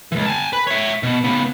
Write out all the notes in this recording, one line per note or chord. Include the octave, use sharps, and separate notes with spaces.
C#2 E3
G#5 A5
B4
C#5 E5
B2
C#3 B3